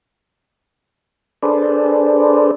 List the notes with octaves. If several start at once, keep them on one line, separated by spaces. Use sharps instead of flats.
D4 G#4 A4 B4 C5 D5